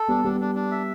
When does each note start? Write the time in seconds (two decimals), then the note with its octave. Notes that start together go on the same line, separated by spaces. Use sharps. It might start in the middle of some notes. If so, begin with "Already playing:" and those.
Already playing: A4
0.08 G3 B3 D4
0.24 G3 B3 D4
0.41 D4
0.55 D4
0.71 E5